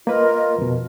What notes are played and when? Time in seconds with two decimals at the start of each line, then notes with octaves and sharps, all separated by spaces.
0.07 A#3 F4 A#4 B4 D#5
0.58 F2 B2